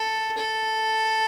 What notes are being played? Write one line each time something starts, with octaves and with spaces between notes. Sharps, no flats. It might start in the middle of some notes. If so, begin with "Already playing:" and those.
Already playing: A4
A4